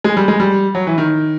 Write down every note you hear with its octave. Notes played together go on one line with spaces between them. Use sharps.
G#3
G3
G#3
G3
F#3
E3
D#3